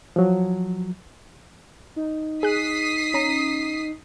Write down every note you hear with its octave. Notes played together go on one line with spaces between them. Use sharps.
F3 F#3
D#4
G#4 D#6 F#6 B6 C7
C#4 A#5